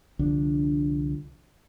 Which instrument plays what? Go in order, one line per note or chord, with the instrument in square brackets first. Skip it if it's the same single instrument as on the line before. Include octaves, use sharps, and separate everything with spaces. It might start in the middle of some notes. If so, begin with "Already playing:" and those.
[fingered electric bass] C2 D3 F3 D4